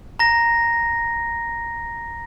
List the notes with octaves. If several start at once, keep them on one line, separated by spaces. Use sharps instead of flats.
A#5 A#6